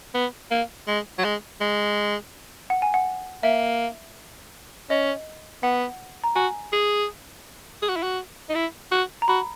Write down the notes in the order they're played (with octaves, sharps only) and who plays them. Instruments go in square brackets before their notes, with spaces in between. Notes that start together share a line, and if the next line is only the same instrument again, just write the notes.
[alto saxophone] B3
A#3
G#3
F#3
G#3
G#3
[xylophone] F#5
G#5
F#5
[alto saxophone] A#3 [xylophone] E5
[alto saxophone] C#4 [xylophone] D#5
[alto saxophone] B3 [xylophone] F#5
[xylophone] A#5
[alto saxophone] F#4 [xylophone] G#5
[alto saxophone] G#4
G#4
F#4
E4
F#4
D#4
E4
F#4
[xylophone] A#5
[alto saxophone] F#4 [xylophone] B5